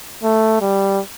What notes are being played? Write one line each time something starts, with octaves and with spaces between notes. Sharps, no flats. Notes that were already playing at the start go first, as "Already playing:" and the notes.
A3
G3